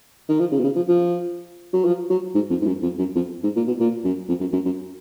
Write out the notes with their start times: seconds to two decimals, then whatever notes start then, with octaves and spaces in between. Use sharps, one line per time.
0.29 D#3
0.40 F3
0.52 C#3
0.59 B2
0.64 C#3
0.76 F3
0.88 F3
1.73 F#3
1.85 F3
2.10 F#3
2.34 G#2
2.50 F2
2.62 G#2
2.67 F#2
2.83 F2
2.99 F#2
3.15 F2
3.43 G#2
3.56 A#2
3.67 B2
3.80 A#2
4.04 F#2
4.29 F2
4.40 F#2
4.53 F#2
4.65 F#2